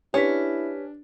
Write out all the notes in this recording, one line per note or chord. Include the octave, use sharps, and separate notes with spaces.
C#4 D4 E4 G4 B4 B6